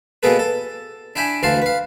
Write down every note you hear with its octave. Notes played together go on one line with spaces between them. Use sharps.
B2 A#3 B3 G#4 A4 B4
A4
D4 E4 G5 G#5 B5
D2 E3 F#4 F5 A5 C6
B4 F5